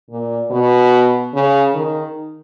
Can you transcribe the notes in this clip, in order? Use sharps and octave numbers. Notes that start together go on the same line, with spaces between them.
A#2
B2
C#3
D#3